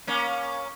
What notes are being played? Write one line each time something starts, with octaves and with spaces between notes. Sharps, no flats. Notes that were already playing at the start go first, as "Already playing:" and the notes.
A#3 C#4